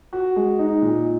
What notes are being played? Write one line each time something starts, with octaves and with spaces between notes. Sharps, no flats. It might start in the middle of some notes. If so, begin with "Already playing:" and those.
F#4
G#3
D#4
A#2